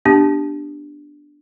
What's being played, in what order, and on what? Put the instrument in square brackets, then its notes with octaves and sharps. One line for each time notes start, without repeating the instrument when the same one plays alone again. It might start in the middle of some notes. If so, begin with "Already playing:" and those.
[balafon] B3 D4 G4